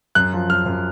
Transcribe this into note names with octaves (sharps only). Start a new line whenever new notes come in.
F#2 F#6
F3
F#2 F6
F#2